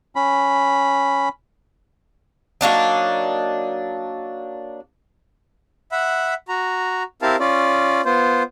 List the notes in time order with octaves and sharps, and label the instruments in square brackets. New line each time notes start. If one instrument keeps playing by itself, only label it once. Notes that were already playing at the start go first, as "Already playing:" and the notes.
[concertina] C#4 B5
[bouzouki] F#3 A#3 D4 D#4
[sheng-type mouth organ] E5 F#5 B5
F#4 A#5
C4 E4 G4 A#4 F5 A5
C#4 F4 D5
B3 F4 C5